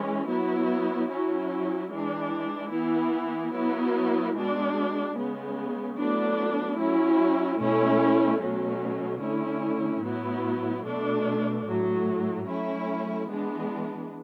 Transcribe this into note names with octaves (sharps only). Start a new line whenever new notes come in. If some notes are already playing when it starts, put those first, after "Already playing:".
Already playing: E3 G#3 C#4
F#3 B3 E4
F#3 C#4 E4
E3 G#3 D4
E3 B3 E4
F#3 B3 E4
B2 G#3 D4
C#3 G#3 B3
A2 F#3 B3 D4
F#3 C#4 E4
B2 A3 C#4 E4
B2 F#3 A3 C#4
D3 A3 C#4 E4
A2 F#3 B3 E4
B2 A3 D4
A2 F#3 A3
F#3 A3 C#4 E4
E3 G#3 B3 D4